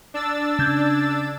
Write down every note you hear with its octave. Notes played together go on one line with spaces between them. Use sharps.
D4 E6 A6
C#3 G6 G#6